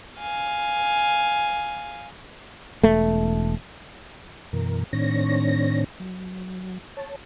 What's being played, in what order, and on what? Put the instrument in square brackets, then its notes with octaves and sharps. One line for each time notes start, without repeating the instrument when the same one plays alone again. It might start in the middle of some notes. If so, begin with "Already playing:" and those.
[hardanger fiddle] F5 G#5
[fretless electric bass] E1 A3
[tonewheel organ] F#2 B2 E3 A#4
A2 D#3 C4 D4 C#5 A#6
F#3
C#5 A5